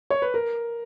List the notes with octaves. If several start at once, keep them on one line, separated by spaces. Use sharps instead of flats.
C#5
B4
A#4